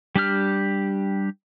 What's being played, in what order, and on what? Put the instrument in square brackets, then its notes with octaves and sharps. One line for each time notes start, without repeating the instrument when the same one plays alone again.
[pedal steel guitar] G3 D4 G4 F6